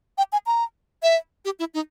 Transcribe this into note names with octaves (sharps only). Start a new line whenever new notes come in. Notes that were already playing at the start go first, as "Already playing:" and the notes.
G5
G#5
A#5
E5
G4
E4
D#4